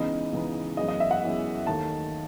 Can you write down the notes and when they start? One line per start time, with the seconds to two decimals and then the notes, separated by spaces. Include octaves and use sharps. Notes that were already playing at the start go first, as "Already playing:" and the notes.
Already playing: C#2 C#3 E3 B3 D#4 D#5
0.33 C#2 C#3 E3 B3 D#4
0.77 F#2 E3 G#3 B3 D#5
0.88 D#5
1.00 E5
1.11 F#5
1.22 F#2 E3 G#3 B3
1.66 D#2 D#3 A3 A5